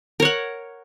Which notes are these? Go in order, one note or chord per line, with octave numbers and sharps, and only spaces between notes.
A#4 C#5 F#5